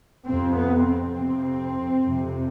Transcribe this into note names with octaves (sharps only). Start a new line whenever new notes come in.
F2 C3 C4
B3
C4
F2 C3
F2 C3